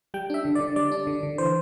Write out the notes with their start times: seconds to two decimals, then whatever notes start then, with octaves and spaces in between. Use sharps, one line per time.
0.14 G3 G5
0.30 D4 E5
0.45 D3
0.55 D5
0.60 D3
0.76 G3 D5
0.92 D4
1.07 D3
1.23 D3
1.38 E3 C5